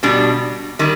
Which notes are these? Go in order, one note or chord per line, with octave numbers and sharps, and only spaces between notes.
B2 G3 D4
D#3 G3